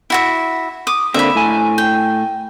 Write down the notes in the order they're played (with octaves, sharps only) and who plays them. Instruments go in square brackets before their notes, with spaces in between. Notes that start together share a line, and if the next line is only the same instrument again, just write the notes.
[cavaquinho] E4 F#4 E5
D6 D#6
[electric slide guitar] D3 A#3 C4 [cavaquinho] E5 B5
[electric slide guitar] A2 G#5
[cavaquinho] G5